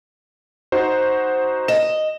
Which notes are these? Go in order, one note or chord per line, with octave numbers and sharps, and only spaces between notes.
D#4 F#4 C5
D#5 E7